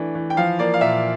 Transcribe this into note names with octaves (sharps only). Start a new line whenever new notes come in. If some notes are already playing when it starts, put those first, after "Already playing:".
Already playing: E3 A3 D4
E3
G5
F3 F5
A#3 D5
F5
A#2 E5